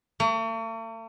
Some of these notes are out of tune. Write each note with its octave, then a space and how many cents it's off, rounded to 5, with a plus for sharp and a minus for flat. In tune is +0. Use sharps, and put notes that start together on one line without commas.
A3 +45